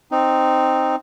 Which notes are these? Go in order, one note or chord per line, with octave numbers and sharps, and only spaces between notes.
C4 D#4